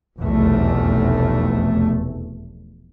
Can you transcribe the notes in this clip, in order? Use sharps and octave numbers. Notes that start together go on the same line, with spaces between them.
F1 B1 E2 A3